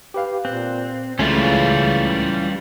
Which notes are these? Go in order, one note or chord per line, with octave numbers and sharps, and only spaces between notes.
G4 B4 F5
A#2 C4 F#6
C#2 C#3 E3 G3 A3 C#4 F4